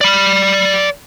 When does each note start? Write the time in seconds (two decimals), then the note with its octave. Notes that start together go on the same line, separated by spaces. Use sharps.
0.01 D5 B5